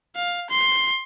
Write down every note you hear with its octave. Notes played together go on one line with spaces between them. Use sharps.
F5
C6